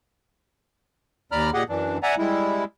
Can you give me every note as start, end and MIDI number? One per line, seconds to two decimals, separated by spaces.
1.32 1.50 39
1.32 1.50 74
1.32 1.50 82
1.32 1.50 83
1.32 1.50 89
1.54 1.63 46
1.54 1.63 67
1.54 1.63 68
1.54 1.63 75
1.54 1.63 78
1.69 1.98 42
1.69 1.98 52
1.69 1.98 62
2.03 2.15 74
2.03 2.15 76
2.03 2.15 78
2.03 2.15 80
2.03 2.15 82
2.18 2.64 55
2.18 2.64 56
2.18 2.64 64